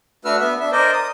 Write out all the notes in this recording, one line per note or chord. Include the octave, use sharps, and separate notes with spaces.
A3 D4 F#4 B4 E6 F6
B3 E5
D4 E5
A#4 C5 D5 D#5
D#6